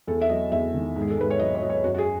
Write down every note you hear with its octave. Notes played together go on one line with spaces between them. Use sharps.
E2 A4
E5
F#3 D#5
E2 E5
D#3
G#2
G#4
A4
G#2 B4
C#5
F#3 D#5
C#5
F#3 D#5
C#5
F#2 F#4
F#4
G#4